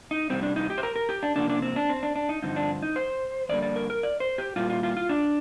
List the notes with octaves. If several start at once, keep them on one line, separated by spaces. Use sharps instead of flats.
D#4
F2 C3 G3 C4
D4
D#4
G4
C5
A#4
A#4
G4
D4
C3 F3 A#3 D4
D4
C4
D4
C4
D4
D4
D#4
G2 D3 F3 C4 D#4
D4
D#4
C5
F2 D3 G3 A#3 D5
D5
A#4
A#4
D5
C5
G4
A#2 G3 A#3 F4
F4
F4
F4
D4